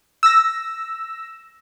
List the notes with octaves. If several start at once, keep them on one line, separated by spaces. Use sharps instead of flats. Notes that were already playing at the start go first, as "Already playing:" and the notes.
E6 A#6